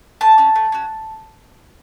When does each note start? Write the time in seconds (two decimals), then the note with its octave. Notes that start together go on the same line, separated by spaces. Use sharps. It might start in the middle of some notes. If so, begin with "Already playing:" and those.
0.21 A3 A5
0.38 C#4 F#4
0.56 A3
0.72 C#4 F#4